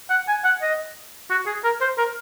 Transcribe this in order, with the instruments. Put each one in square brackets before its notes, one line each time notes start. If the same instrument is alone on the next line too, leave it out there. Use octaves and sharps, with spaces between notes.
[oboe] F#5
G#5
F#5
D#5
F#4
G#4
A#4
C5
A#4